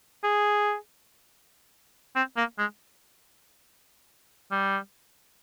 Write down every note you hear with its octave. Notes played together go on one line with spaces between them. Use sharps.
G#4
C4
A#3
G#3
G3